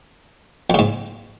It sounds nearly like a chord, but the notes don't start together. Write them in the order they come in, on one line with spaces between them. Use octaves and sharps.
F2 C#3 G#2